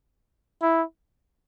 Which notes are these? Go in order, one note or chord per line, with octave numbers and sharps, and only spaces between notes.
E4